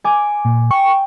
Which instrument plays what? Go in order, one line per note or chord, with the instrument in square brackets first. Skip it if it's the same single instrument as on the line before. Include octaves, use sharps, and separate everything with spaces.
[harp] G#5 D6
[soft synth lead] A#2
[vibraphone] G5 [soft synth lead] C#6